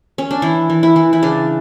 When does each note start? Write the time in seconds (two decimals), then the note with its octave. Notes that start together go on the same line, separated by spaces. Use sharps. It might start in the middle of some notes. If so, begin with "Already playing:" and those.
0.18 C#4
0.31 D4
0.42 E3 E4
0.70 E3
0.83 E4
0.96 E3
1.13 E4
1.23 C#3 D4